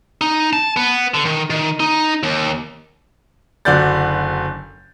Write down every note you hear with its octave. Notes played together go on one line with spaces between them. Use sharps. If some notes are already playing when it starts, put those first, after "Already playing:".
D#4
A5
B3
D3
D#3
D#3
D#4
D#2
F#1 D3 F#4 D5 G6 A6